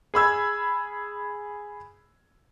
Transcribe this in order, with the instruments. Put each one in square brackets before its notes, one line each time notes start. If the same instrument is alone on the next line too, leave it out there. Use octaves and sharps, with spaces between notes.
[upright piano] G#4 B5 E6 G#6